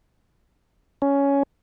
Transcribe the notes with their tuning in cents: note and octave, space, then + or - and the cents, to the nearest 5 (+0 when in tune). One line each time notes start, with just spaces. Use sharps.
C#4 +10